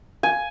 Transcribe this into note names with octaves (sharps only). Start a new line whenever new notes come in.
G#5